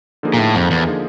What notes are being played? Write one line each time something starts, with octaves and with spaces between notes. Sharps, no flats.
D3 F3 A#3 D#4 G#4
A#2
A2
F2
E2
D3 F3 A#3 D#4 G#4